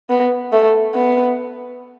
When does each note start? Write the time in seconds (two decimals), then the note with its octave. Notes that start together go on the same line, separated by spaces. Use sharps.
0.09 B3
0.52 A3
0.95 B3